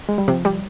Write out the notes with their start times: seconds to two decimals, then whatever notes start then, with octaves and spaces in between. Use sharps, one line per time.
0.09 G#3
0.18 G3
0.27 C3 F3
0.45 G3